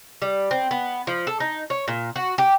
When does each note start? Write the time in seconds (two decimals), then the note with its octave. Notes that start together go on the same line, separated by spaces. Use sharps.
0.22 G3
0.51 C4
0.71 B3
1.07 F3
1.27 A4
1.40 D#4
1.70 C#5
1.88 A#2
2.16 F#4
2.38 G4